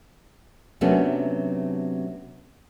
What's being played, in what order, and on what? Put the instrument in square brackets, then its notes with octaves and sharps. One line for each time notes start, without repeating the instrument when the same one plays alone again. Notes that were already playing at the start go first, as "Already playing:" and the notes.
[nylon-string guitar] C3 F#3 A3 B3 C#4 D4